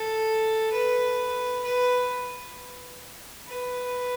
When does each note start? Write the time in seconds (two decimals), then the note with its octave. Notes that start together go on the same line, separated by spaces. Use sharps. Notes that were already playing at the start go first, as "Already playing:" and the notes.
Already playing: A4
0.72 B4
1.64 B4
3.47 B4